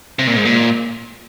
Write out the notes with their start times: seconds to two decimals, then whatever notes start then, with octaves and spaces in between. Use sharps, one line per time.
0.19 C3
0.27 A#2
0.37 G#2
0.45 A#2